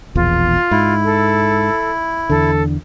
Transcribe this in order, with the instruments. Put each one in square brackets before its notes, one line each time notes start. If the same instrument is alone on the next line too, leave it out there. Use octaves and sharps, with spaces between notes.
[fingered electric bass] E1 A#1 E2 [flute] F4
[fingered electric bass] G#2 [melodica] E4
[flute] A4
[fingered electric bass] E2 D3 [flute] A4